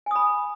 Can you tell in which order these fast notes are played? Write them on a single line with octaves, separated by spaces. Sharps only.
G#5 D#6 B5